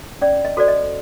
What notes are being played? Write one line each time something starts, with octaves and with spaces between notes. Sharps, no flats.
C#4 D5
D#5
F#4 A4 C5 D5
D#5